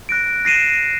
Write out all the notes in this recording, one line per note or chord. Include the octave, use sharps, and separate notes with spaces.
F#6 A#6 D7
A#6 C7 D#7 E7